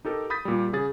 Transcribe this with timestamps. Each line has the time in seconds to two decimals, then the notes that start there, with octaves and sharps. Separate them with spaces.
0.05 D#4 G4 A4 A#4
0.30 B5 D#6 G6 A6 B6
0.45 A#2 G3
0.73 C#3 G#4 A6